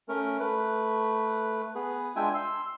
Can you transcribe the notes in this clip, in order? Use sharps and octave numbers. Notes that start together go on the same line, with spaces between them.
A3 C#4 A#4
A3 B4
B3 G#4 B4
G#3 D4 F4 E5 G5 G#5
C6 E6